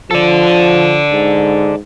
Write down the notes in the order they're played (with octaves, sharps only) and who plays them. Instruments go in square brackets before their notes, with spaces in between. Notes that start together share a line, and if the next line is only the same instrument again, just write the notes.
[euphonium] F3 [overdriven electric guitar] A4 D5
[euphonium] G#2